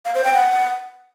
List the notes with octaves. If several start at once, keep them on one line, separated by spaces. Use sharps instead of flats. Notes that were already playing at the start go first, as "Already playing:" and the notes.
F5
C5
G5
F#5